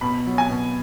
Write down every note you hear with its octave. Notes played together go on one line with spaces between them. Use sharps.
B2 B5
F#3
G#5
B2